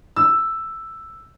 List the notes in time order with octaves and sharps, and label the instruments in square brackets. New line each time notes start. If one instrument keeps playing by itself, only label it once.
[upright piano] E6